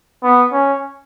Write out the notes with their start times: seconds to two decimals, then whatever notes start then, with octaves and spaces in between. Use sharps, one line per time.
0.23 B3
0.52 C#4